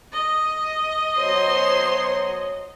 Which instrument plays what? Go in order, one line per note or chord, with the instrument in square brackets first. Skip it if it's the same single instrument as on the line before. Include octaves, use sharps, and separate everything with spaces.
[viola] D#5
[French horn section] B2 F#3 C#5 [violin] C5 C6